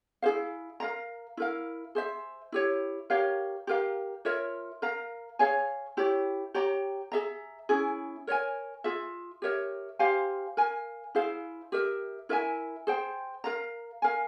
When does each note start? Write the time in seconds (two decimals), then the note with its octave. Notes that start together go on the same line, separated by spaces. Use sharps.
0.22 E4 G#4 C5 F5
0.80 A#4 F5 A#5
1.37 E4 A#4 F5
1.95 G#4 C5 E5
2.52 E4 G4 C#5
3.10 G4 A#4 C#5 F5
3.67 G4 A#4 F5
4.25 F4 A#4 C#5 E5
4.82 A#4 F5 A#5
5.39 G#4 C#5 F5 G#5
5.97 E4 G4 C#5
6.54 G4 C#5 G5 A#5
7.12 G#4 E5 A#5
7.69 C#4 E4 G#4
8.27 A#4 C#5 E5 G#5
8.84 F4 G#4 E5
9.42 G4 A#4 C#5 E5
9.99 G4 C5 F5 G#5
10.57 A#4 F5 G#5
11.15 E4 G#4 C5 F5
11.72 G4 A#4 E5
12.29 E4 A#4 E5 G#5
12.87 G#4 C5 G5
13.44 A#4 F5 A#5
14.02 A#4 F5 G#5